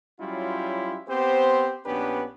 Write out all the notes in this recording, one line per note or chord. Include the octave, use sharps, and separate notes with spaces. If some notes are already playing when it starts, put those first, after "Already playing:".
F#3 G3 C#4 E4 F4
B3 C4 G4 C5
A#1 B3 C#4 D4 G4 B4